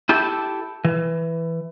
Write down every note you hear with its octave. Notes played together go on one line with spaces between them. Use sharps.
E4 G4 A4
E3